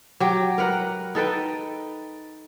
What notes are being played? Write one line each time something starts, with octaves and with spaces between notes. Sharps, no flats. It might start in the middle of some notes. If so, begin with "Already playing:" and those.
F#3 G4
A#4 B4 F#5
D#4 A4 B4 G5